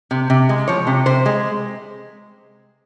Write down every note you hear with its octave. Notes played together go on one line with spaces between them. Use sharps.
C3
C3
G#3
F3 C#5
C3
C3 C5
G#3